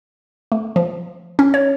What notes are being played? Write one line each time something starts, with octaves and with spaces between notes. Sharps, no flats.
A3
F3
C#4
C#5